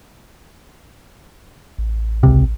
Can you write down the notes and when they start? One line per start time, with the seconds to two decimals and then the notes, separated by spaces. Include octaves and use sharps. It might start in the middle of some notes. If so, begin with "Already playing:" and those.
1.78 A1
2.23 C#2 C3